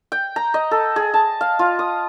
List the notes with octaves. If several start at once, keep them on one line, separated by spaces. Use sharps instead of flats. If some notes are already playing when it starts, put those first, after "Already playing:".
G5
A#5
D#5
A4
G#4
A5
F5
F4
D#6